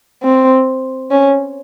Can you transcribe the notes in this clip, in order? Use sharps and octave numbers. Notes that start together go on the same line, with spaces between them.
C4
C#4